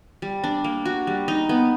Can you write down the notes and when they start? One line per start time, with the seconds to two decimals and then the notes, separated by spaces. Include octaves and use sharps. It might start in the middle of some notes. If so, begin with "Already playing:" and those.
0.22 G3
0.44 D4
0.64 A#3
0.85 F#4
1.07 G3
1.28 D#4
1.49 B3